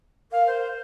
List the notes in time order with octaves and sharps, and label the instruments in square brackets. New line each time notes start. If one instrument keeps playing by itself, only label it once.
[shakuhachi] A#4 [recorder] F5
[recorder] C5